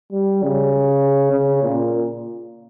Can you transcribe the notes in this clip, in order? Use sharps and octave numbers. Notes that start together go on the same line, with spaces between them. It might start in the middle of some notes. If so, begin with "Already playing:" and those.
G3
C#3
C#3
A#2